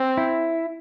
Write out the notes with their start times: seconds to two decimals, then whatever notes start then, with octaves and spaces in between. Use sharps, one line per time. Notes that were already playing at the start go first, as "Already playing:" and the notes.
Already playing: C4
0.17 E4